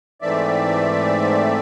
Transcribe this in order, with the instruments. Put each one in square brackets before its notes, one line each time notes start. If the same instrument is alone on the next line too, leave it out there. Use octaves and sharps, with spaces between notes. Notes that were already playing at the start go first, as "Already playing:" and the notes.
[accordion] G#2 E3 A3 C4 D5 E5